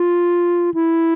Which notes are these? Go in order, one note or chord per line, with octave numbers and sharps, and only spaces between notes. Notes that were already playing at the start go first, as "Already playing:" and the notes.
Already playing: F4
E4